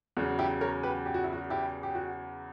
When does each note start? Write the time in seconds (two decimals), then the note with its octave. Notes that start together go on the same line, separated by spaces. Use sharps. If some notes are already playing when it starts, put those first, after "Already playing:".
0.17 E2 C#3 F#3 F#4
0.39 E4 G4
0.61 A#4 C#5
0.83 G4 B4
1.06 G4
1.14 F#4
1.24 E4
1.33 F#4
1.50 E4 G4
1.83 G4
1.95 F#4